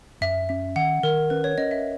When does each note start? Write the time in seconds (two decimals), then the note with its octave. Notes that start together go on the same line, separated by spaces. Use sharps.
0.21 F#2 E5
0.49 C#4 E5
0.76 D#3 F#5
1.03 D#3 A#4
1.30 C#4 B4
1.44 C#5
1.58 C#4 D#5
1.71 E5